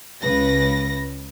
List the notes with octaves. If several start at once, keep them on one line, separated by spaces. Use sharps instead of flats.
C#2 C#3 B4 A#6